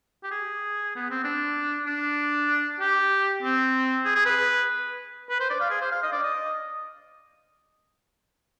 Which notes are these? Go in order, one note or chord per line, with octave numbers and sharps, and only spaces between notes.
G4
G#4
B3
C4
D4
D4
G4
C4
G#4
G#4
B4
B4
C5
D5
F5
G#4
C5
F5
D#5
D5
D#5